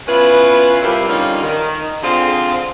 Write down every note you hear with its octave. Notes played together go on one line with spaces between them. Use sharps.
B3 C#4 E4 F4 B4
C3 G3 A#3 E4 F4 G4
D3 G3 A#3 C#4 D#4 F4
D#3
D3 C4 F4 G#4